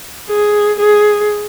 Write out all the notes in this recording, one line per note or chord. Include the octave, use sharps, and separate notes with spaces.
G#4
G#4